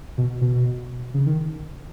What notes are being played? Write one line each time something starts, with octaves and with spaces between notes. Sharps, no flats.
B2
B2
C#3
D#3